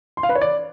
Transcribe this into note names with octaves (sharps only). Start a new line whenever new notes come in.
C6
F5
B4
C#5
D5